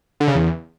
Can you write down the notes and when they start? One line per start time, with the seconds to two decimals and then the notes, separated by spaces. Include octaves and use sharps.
0.20 D3
0.28 C#3
0.35 E2